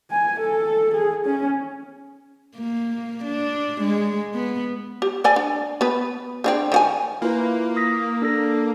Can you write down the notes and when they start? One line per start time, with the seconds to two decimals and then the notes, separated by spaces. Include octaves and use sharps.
0.11 G#5
0.40 A4
0.94 G#4
1.26 C#4
2.56 A#3
3.24 D4
3.81 G#3
4.34 B3
5.02 G4
5.24 A4 D5 G#5
5.36 D4
5.81 B3 B4
6.44 C4 D4 G#4
6.72 D#3 F#4 G#5
7.22 A#3 E4 F4 B4
7.77 D#6 A#6 B6
8.22 D4 A4 A#6